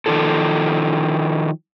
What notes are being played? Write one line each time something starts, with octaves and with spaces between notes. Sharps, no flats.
D#3 F3 A4